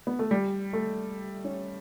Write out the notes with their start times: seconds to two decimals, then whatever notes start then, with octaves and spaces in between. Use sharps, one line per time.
0.07 B3
0.19 A3
0.31 G3
0.73 A3
1.45 C#4